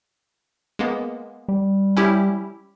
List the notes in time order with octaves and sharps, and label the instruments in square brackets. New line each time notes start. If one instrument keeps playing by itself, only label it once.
[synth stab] G#3 A#3 B3
[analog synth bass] G3
[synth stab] C#4 E4 G4